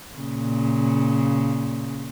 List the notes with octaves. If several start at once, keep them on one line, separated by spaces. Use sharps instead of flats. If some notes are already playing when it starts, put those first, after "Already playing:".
A#2 C#3